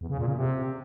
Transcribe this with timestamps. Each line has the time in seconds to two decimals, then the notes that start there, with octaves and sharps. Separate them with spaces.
0.01 E2
0.10 C#3
0.18 A#2
0.27 C#3
0.36 C3